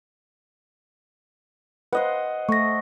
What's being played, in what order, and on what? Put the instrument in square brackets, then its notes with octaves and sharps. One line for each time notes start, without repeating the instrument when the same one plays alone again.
[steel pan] B4 [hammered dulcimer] C5 D#5 F#5
[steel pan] A3 [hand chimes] C#6 A#6